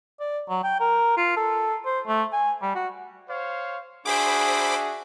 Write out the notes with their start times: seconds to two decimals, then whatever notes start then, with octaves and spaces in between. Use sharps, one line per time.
0.20 D5
0.49 F#3
0.64 G5
0.80 A#4
1.17 F4
1.37 A4
1.85 C5
2.07 A3
2.33 G#5
2.62 G3
2.75 F#4
3.28 C5 C#5 F5
4.05 D4 F#4 G#4 C5 E5 B5 D6